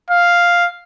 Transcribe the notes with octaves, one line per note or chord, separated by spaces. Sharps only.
F5